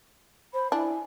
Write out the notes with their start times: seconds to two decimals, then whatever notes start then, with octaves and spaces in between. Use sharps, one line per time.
0.54 C5 B5
0.72 D4 E4 G#5